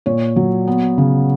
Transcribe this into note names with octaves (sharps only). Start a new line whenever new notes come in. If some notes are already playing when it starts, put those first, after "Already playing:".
A#2 C#5
F#3
B3
C#3